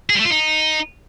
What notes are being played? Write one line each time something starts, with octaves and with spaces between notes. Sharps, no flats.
G#4
G3
A3
F4
D#4